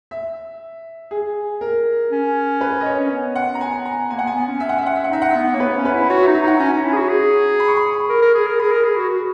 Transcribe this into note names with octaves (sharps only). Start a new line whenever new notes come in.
E5
G#4
A#4
C#4
B4
D#5
C#5
C#4
B3
F#5
A#5
G#5
A#5
A#3 G#5
F#5
B3
G#5
B3
C#4
E5
F#5
E5
F#5
E5
F#5
D#4 E5
F#5
B3 E5
A#3 C#5
B3 B4
C#4
B4
E4
F#4 C#5
E5
D#4
E5
D#4 F#5
C#4 A#5
C#4
E4
G#4
F#4
G#4
B5
C#6
B5
A#4
A#4
G#4
A#4
G#4 B5
A#4
G#4
F#4
F#4